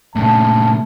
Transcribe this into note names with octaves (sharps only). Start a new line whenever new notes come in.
A#2 C#3 A3 A5